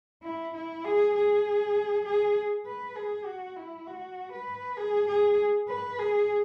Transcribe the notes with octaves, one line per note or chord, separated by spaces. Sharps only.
E4
E4
G#4
G#4
G#4
B4
G#4
F#4
E4
F#4
B4
G#4
G#4
B4
G#4